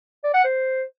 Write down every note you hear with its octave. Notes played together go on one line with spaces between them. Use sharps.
D5
F#5
C5